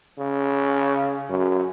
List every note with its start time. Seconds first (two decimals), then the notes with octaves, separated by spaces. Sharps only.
0.18 C#3
1.30 F#2